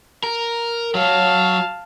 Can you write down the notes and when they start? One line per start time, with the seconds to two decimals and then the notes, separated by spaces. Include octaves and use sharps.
0.24 A#4
0.95 F#3 F5 A5